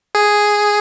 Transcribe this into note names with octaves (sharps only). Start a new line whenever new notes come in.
G#4